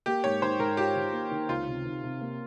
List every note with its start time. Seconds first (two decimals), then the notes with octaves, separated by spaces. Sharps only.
0.06 A#3 G4
0.24 G#2 C#5
0.42 D#3 C5
0.59 G#2 A#4
0.77 F4 G4
0.96 D#3
1.13 A#3
1.31 D#3
1.49 C#2 F4
1.67 C3
1.85 D#3
2.03 C3
2.21 A#3